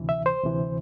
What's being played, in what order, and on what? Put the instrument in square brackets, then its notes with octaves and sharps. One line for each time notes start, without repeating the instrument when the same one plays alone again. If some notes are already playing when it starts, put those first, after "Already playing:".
Already playing: [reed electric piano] D2 C3 E3
E5
C5
D2 C3 E3